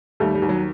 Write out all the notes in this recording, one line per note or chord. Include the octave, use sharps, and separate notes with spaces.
D#2 G3 A3
G3
D#2
F#3